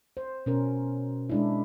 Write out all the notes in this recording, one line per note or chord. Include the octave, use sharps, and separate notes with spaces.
C5
B2 C#4 A#4
G#3 D4 E4